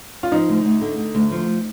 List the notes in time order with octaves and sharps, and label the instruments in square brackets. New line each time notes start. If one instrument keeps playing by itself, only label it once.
[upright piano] F4
[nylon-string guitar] F3 [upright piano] D#4
[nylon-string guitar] D2
D2
D3
D3
D2
F3